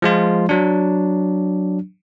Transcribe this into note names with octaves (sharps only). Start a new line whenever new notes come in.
F3 G#3 F4
F#3 D4